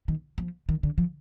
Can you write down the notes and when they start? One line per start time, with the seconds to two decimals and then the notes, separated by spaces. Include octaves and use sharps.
0.08 D#3
0.38 F3
0.69 D#3
0.83 D3
0.98 F3